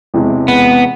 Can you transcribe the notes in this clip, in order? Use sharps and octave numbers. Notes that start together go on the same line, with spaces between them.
E1 E2 C3 E3 G#3
B3